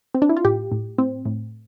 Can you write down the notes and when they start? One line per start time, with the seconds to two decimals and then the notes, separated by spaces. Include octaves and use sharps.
0.14 C4
0.22 D4
0.29 E4
0.37 F4
0.44 A2 G4
0.72 A2
0.98 A2 C4
1.25 A2